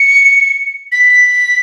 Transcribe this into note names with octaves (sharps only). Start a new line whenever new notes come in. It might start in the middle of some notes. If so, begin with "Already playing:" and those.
Already playing: C#7
B6